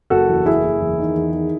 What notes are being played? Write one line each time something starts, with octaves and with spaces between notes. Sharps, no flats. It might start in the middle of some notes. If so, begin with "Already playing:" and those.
F#1 F#4 A4
E2
F#1 E4 G#4
F#1
E2
D#3
E2
D#3